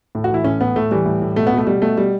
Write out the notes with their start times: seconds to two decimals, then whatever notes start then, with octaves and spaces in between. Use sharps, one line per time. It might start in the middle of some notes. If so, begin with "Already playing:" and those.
0.15 A2
0.24 F#4
0.30 E3 E4
0.44 A2 C#4
0.61 A2 B3
0.76 A2 A3
0.91 E3 G3
1.06 A2
1.22 A2
1.36 B2 A3
1.47 B3
1.52 B2
1.57 A3
1.67 B2 G3
1.82 B2 A3
1.97 B2 G3